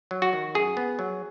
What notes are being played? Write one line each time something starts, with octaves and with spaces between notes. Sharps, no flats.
F#3
F#4
D#3
F#2 G#4
B3
F#3